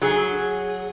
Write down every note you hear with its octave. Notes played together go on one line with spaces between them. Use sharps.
F#3 G#4